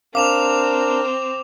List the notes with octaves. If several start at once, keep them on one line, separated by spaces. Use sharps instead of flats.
C4 D4 A#4 F5 D6 E7 F7